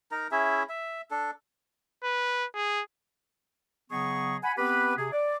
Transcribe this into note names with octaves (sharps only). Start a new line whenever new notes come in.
D#4 A#4 A#5
C#4 E4 G#4 E5
E5
D4 A4
B4
G#4
C#3 F#3 B3 G#4 D#5 C#6
F#5 G#5 B5
B3 C4 G4 B4
C3 G#4
D5